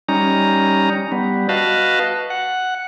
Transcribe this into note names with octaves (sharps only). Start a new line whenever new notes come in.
G3 C#4 D#4 A#5
G3 B3
F#4 B4 D#5 F5 A5
F#5